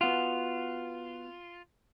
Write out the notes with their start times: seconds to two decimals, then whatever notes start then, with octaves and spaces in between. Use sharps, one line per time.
0.01 B3 F4 F#4